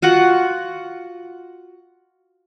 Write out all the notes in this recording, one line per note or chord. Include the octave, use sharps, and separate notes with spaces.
F4 F#4 F#5